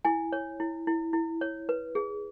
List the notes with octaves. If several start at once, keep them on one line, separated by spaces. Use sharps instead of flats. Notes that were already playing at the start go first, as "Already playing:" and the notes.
E4 G#5
C#5
E4
E4
E4
C#5
B4
G#4